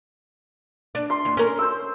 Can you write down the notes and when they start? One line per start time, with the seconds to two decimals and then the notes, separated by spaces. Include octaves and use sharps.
0.95 D4
1.10 C6
1.25 D#2
1.37 C#4 A#4
1.59 C5 E6